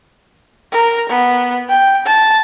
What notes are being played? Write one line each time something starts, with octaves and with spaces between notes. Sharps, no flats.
A#4
B3
G5
A5